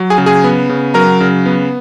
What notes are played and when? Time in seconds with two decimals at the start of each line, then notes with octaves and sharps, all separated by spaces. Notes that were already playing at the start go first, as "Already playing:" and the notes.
Already playing: F#3
0.10 G#4 G#5
0.18 C#3
0.26 G#4 G#5
0.44 B3
0.69 C#3
0.94 F#3 A#4 A#5
1.20 C#3
1.46 B3